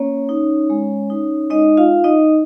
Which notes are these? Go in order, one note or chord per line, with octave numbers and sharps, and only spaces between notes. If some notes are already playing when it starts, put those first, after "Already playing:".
Already playing: A#3 C#4 C#5
D#4
G#3
D#4
G#3 D#4 D#5
F4 F5
D#4
D#4 D#5